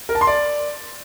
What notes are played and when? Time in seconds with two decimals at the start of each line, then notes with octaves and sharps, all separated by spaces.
0.09 A#4
0.15 A5
0.21 C6
0.27 D5